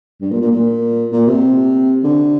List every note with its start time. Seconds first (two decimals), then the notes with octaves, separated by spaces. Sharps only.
0.21 G2
0.31 A#2
0.41 A#2
0.51 A#2
1.13 A#2
1.28 C3
2.04 D3